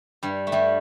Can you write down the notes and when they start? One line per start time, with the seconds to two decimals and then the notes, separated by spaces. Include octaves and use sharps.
0.23 G2 G3
0.47 A3
0.52 G2 G3